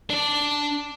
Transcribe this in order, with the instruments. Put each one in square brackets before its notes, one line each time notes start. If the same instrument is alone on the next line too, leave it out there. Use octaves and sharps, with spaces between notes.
[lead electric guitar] D4 D5